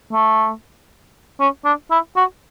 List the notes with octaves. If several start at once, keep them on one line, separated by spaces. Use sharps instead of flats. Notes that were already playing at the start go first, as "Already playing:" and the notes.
A3
C#4
D4
E4
F#4